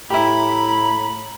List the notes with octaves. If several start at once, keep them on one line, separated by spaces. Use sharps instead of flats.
A2 E4 G4 A#5 B5